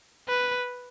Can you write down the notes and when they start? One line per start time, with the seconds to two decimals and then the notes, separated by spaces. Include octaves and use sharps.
0.28 B4